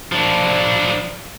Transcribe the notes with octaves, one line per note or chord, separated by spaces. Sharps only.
F3 D4